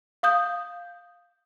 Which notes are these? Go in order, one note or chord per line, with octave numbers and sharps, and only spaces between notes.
F5 D#6 G6